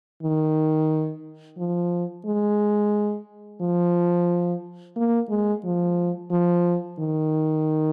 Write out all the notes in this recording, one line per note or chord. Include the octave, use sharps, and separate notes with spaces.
D#3
F3
G#3
F3
A#3
G#3
F3
F3
D#3